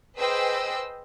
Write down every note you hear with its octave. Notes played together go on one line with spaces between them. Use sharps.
G#4 B4 C5 D#5 G5 E6